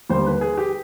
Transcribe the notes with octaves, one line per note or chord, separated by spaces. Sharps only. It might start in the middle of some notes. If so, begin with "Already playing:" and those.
D#2 D3 G3 C5
B4
G#4
G4